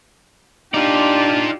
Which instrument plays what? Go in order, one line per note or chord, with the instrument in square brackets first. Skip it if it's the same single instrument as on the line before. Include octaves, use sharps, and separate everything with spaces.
[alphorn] D4 [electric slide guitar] D#4 [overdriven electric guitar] F4 D5 [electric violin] G4